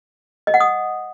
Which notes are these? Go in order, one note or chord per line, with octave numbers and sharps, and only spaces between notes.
D#5
F#5
D#6